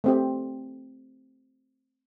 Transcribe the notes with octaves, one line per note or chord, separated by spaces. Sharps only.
A3 C4 G4